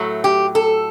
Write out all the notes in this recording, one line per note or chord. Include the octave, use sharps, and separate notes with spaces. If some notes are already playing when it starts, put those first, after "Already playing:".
Already playing: A2 F#3 A3
G4
A4